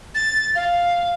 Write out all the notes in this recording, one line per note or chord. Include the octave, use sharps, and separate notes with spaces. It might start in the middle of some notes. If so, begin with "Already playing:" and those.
A6
F5